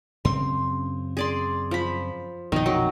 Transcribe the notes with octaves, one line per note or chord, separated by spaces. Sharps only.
F#2 C#3 C4 C6
G#4 D5 C6
F3 B5
A#1 F2 B2 D#3 D#4
F#3